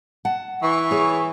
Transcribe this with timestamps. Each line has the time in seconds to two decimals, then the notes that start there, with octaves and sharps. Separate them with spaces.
0.25 F#5 A5
0.62 E3 C#6
0.91 G#4 C#5